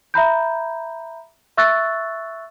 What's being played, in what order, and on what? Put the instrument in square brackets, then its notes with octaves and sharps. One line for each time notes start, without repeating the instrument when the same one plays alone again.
[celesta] E5 A#5 B5 G6
E5 C#6 E6 F#6 A6